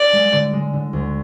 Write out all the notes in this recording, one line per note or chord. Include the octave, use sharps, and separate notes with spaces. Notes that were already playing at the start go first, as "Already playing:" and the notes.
Already playing: D5
G#3
D3
G#3
D3
D2